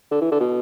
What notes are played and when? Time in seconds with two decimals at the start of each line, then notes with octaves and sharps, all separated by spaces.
0.11 D3
0.21 E3
0.32 D3
0.40 B2